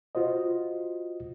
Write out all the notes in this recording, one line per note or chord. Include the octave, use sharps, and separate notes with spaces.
F4 F#4 C5 D#5